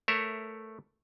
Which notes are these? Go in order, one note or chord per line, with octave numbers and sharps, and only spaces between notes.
A3 A#4 C#5 E5